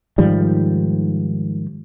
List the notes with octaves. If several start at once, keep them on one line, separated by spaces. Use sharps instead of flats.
G#2 D#3 F3 G3